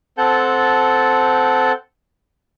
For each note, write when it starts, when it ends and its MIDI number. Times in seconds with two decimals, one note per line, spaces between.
0.18 1.72 60
0.18 1.72 69
0.18 1.72 78
0.18 1.72 81
0.18 1.72 91